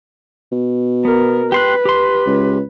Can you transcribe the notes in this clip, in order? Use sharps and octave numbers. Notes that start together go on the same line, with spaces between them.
B2
B3 A#4
G4 B4 C6 F#6
G4 C6
C#2